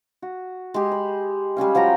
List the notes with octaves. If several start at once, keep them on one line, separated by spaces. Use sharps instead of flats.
F#4
G#3 G4
B5
G3 G#3 C#4 F5
F3 F#3 G5 A#5